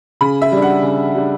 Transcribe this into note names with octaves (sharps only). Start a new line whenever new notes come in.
C#3 B5
E5
G3 D4
F#5
C#3
G3 D4